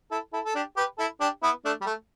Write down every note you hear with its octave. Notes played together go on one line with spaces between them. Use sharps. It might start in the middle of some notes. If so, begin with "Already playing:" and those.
E4 A4
E4 A4
A4
D4 G4
G4 B4
E4 A4
D4 G4
B3 E4
A3 D4
G3
A3